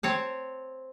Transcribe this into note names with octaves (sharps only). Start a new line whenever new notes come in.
C4 C#5 A5